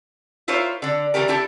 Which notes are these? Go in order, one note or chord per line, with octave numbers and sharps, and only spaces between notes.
E4 F4 A#4 C5 C#5
D3 D4
E3 G3 A3 G4 A#4
D4 E4 G4 A4